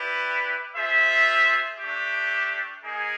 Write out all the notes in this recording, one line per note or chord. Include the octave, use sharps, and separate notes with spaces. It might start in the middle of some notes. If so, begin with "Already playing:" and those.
Already playing: E4 G4 B4 D5
F4 G#4 C5 E5
A3 D4 G4
A#3 D#4 G#4